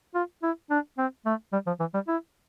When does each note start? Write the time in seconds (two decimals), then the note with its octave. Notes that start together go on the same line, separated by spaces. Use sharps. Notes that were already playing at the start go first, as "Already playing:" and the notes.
0.15 F4
0.43 E4
0.70 D4
0.98 C4
1.25 A3
1.53 G3
1.67 F3
1.80 E3
1.94 G3
2.08 E4